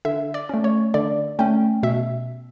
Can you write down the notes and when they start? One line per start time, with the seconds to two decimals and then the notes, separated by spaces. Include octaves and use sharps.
0.05 D3 E5
0.34 D5
0.49 A3 C#4
0.64 C#5
0.94 D3 D5
1.39 A3 C#4 G5
1.83 B2 E5